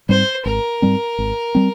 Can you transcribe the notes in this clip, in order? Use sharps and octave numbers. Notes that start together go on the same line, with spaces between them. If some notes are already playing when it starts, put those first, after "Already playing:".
G#2 G3 C4 C5
G#1 A#4
G#2 G3 C4
G#1
G3 C4